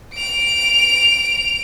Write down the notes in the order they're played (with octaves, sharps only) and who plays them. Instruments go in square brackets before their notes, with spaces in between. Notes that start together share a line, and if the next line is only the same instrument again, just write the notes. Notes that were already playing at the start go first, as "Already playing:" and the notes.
[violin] D7 F7